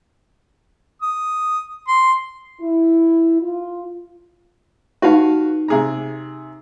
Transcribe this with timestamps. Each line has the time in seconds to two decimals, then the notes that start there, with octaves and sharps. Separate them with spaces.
1.02 D#6
1.88 C6
2.61 E4
3.42 F4
5.02 D#4 F#4 G4 B4 F5
5.68 C3 G#4 A#5